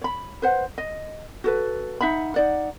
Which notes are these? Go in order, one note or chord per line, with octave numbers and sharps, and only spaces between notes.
C#5 B5
B4 C5 F#5
D#5
F#4 A4 B4
D#4 E5 F#5 B5
D#4 D5 F#5